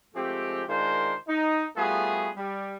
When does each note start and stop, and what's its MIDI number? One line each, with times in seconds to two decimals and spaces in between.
0.14 0.63 53
0.14 0.63 56
0.14 0.63 57
0.14 0.63 60
0.14 0.63 67
0.68 1.14 51
0.68 1.14 56
0.68 1.14 62
0.68 1.14 65
0.68 1.14 70
0.68 1.14 72
1.28 1.65 63
1.76 2.29 55
1.76 2.29 57
1.76 2.29 59
1.76 2.29 65
1.76 2.29 66
1.76 2.29 68
2.36 2.76 55